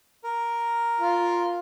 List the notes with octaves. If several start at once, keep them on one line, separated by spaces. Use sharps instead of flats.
A#4
F4